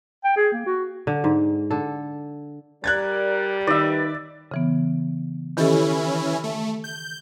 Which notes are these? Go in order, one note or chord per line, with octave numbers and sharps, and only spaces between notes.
G5
G#4
A#3
F#4
D3
G#2
D3 A4
G3 A#4 D5 F#6 G#6 A6
D#3 B4 D5 E5
C#3 E3 B3
D#3 E3 C#4 E4 G4 A4
A3
G6